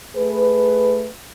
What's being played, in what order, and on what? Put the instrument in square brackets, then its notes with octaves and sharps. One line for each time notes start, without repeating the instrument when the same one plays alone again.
[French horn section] A3 G#4 B4